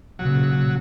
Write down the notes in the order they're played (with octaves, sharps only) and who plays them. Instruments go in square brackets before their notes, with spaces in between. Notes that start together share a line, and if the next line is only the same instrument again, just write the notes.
[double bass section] B1 A#2 C#3 [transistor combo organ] F#3